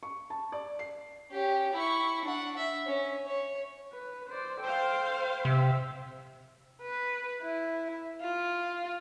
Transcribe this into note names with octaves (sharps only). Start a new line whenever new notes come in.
C#6
A5
D5
C7
C#4 G4
E4 C#6
D4 F#5
E5
C#4
C#5
B4
C5 D5
A4 C5 F5 G5
C3 E5
B4
E4
F4